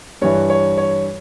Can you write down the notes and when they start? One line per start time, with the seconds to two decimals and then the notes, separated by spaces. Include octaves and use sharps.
0.22 G2 E3 C#5
0.50 C#5
0.78 C#5